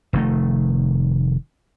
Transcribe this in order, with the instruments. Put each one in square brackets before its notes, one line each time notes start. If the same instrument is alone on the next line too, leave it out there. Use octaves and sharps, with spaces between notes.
[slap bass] F1 D#3 A3